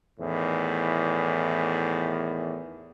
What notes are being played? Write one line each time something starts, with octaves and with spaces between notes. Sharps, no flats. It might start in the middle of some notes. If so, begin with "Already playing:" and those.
E2 A2 D#3